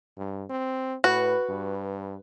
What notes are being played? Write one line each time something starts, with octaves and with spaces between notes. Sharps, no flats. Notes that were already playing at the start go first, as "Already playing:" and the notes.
G2
C4
A2 F#4 B4
G2